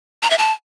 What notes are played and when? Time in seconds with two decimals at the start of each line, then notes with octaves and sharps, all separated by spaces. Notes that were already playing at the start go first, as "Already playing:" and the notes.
0.23 A#5
0.30 E5
0.38 A5